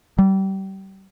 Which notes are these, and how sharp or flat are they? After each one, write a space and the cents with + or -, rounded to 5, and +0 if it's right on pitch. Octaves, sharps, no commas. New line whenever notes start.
G3 -30